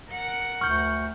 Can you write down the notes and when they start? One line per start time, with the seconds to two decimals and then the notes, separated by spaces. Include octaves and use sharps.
0.10 A#4 F#5
0.61 D2 C#6 F6 G6 C#7